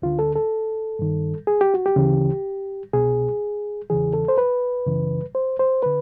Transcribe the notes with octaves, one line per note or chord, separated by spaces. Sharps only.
D2 D3 F4
A4
A4
G2 D#3
G#4
G4
F#4
G4
D2 C#3 E3
C2 B2 G#4
E2 C#3 E3 G#4
A4
C5
B4
F#2 C#3 E3
C5
C5
D3 B4